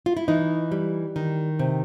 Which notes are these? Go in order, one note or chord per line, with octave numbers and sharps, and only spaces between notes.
F4
E4
E3 D#4
G3
D#3
C3